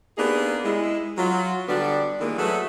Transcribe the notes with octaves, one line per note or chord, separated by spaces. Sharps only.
A#3 B3 D4 D#4 G4 G#4
G#3 E4
F#3 F4
D3 G3 B3 D4 F#4 B4
D#3 E3 G3 G#3 A#3 D4
F#3 A3 F#4 G#4 B4 E5